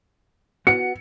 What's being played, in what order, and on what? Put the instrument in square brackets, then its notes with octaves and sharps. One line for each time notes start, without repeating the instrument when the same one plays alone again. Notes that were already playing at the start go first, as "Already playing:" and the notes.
[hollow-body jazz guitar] B3 F#4 F#5 [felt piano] C#7